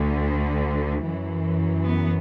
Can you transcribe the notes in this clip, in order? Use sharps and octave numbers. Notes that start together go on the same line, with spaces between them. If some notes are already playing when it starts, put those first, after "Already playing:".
Already playing: D2 D3
F#2 E3
B3